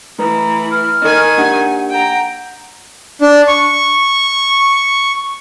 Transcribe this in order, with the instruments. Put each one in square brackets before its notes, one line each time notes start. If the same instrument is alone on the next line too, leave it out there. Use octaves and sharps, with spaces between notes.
[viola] E3 [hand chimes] A3 B4 [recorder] A#5
[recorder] F6
[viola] D#3 G#5 [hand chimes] D#5 F#6
[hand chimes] A#3 D4 G4 [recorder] F#5
[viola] G5 A#5
[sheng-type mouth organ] D4
C#6